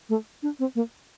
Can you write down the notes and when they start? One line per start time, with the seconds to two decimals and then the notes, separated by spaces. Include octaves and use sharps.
0.09 A3
0.43 D4
0.59 C4
0.75 A#3